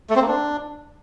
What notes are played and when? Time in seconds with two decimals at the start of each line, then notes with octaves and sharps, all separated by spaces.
0.10 A3
0.16 C4
0.22 A#3
0.28 D4